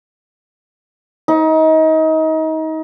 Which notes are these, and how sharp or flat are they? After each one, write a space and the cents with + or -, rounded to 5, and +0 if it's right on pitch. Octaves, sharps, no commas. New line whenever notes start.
D#4 +30